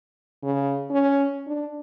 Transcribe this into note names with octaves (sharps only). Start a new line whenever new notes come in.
C#3
C#4
D4